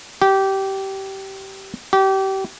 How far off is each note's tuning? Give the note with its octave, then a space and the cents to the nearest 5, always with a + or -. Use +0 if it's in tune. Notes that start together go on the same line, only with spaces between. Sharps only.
G4 -20
G4 -30